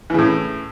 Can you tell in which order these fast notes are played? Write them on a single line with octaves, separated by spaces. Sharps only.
E3 C#3 A2